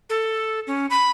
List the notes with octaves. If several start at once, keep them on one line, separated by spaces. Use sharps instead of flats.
A4
C#4
B5